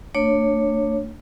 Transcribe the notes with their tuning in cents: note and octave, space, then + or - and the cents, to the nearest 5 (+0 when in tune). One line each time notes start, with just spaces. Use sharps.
A3 +35 D4 +5 C#5 +0